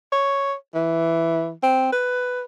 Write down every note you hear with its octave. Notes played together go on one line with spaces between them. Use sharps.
C#5
E3
C4
B4